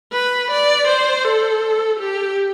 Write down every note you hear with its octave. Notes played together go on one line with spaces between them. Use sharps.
B4
D5
C5
A4
G4